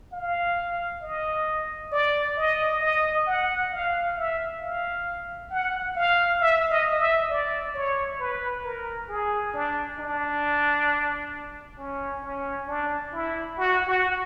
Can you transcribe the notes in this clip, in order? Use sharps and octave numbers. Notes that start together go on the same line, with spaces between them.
F5
D#5
D5
D#5
D#5
F#5
F5
E5
F5
F#5
F5
E5
D#5
E5
D5
C#5
B4
A#4
G#4
D4
D4
C#4
C#4
D4
E4
F#4
F#4